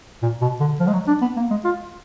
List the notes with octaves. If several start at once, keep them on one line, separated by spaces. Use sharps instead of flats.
A#2
B2
D3
F3
G#3
F#3
D4
B3
A#3
G#3
F4